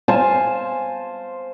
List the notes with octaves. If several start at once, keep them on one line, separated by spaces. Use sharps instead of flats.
C5 F5 G#5 A5